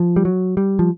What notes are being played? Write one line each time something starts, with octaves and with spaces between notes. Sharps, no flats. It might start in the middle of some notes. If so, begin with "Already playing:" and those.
Already playing: F3
G3
F#3
G3
F3